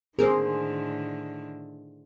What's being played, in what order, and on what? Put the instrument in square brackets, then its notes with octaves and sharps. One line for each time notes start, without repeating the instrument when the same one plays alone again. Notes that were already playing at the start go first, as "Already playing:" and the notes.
[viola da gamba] A2 D3 D#3 [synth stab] A#3 C4 A#4 [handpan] G#4 C5